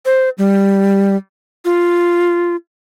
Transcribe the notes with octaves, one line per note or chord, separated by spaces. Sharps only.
C5
G3
F4